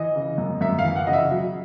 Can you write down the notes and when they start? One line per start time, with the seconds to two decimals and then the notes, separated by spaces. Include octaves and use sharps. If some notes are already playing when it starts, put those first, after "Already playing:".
Already playing: E3 D#5
0.16 C#3
0.38 F#2
0.61 F#2 E5
0.79 F5
0.84 E3
0.96 F#5
1.07 C#3 D#5
1.13 E5
1.31 F#3